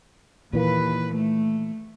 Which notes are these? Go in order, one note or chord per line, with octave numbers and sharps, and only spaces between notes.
D#2 A#2 E3 A#3 B4
A3